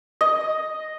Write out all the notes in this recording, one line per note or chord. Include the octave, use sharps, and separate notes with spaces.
D#5